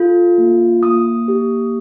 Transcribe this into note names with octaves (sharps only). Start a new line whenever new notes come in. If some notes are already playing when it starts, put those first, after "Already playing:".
Already playing: F4 A4
A#3
A#3 D#6
G4